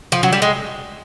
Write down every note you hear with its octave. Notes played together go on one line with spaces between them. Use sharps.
F3
F#3
G3
G#3